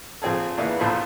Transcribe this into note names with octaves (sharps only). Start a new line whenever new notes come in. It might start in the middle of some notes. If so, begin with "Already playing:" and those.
A#1 F3 C4 G#4 A4
C#3 E3 A#3 B3 D4 E4
A#1 E2 A#2 A4 C5 B5